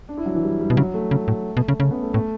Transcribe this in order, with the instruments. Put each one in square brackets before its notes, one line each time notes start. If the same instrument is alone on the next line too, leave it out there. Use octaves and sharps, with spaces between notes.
[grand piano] D4
E4
F#3
E3
G3
G3
[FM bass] B2
[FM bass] C#3 [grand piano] F#3
[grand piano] A3
[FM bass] C#3
A2
B2
C#3
[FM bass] C#3 [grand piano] C#4
[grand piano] B3
A3
[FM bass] A2 [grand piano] A3